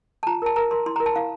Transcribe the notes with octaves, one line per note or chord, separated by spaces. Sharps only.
A5
F4 A#5
A#4 A5
A#4 A#5
A#4 C6
E4 C6
A#5
A#4
A5
E4 F5